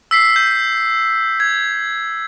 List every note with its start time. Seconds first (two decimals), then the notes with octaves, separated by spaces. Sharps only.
0.11 E6 B6 C7
0.36 G6
1.40 G#6